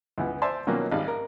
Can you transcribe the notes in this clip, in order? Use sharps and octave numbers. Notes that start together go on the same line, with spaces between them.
C#2 E3 B3
C5 D5 E5 G#5 A5 C6
B2 D#3 F3 F#3 A#3 C#4
G#1 G3 F5
A#4